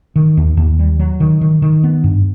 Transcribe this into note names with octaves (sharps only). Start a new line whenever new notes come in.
D#3
D#2
D#2
G3
F#3
D#3
D#3
D#3
B3
G2